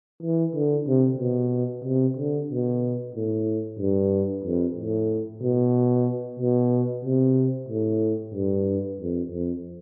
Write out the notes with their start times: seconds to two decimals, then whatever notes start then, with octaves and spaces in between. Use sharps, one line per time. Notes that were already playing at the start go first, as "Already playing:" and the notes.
0.23 E3
0.55 D3
0.87 C3
1.19 B2
1.84 C3
2.17 D3
2.50 B2
3.15 A2
3.79 G2
4.44 F2
4.76 A2
5.42 B2
6.39 B2
7.04 C3
7.69 A2
8.34 G2
9.00 F2
9.31 F2